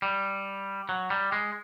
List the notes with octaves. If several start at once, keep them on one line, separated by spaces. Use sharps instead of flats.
G3
F#3
G3
G#3